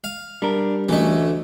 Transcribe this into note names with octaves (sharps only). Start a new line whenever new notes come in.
F5
G3 D4 A#4
D2 E3 A3 C#4 D#5